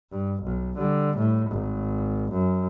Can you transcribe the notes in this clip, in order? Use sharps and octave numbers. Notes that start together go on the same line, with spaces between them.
G2
B1
D3 G3
A2
G#1
F#2